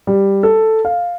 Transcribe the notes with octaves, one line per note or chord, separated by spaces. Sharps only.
G3
A4
F5